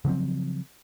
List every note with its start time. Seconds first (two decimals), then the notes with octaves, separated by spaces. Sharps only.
0.05 C#3 F3 F#3 C4